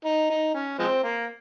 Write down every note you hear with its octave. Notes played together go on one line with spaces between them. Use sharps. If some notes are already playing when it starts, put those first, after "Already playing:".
D#4
D#4
C#4
F3 G#3 C4
A#3